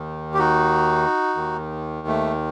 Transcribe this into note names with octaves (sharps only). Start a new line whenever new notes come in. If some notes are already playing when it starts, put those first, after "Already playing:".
Already playing: D#2 D#3
G4
D#4 F#4
D#2 D#3
A3